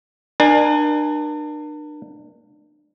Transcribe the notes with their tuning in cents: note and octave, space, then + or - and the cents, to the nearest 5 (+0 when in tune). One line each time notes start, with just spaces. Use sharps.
D4 +35 A#4 +35 G#5 +0